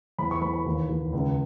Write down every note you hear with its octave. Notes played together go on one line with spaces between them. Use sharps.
E2 B5
C#6
E2 B5
B5
D#2
D#2
C#2